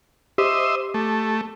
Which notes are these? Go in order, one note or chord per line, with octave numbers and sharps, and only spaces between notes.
G4 C5 D#5 E5
A3